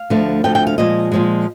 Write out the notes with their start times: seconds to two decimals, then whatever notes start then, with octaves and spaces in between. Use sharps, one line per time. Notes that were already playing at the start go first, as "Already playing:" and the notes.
Already playing: F5
0.10 D2 D3 F3 A3
0.44 D2 D3 F3 A3 G5
0.55 G5
0.67 F5
0.78 A#2 F3 G#3 D#5
1.12 A#2 F3 G#3